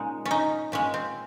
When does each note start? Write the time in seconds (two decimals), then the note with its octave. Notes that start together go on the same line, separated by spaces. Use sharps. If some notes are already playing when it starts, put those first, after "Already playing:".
Already playing: A#2 G#3 C#4 D#4
0.25 C#4
0.31 D#4
0.72 A#2 G#3 C#4
0.94 C4